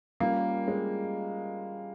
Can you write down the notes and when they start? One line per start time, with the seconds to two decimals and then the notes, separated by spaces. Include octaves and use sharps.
0.20 G3 A#3 C#4 F4 A#4
0.68 G#3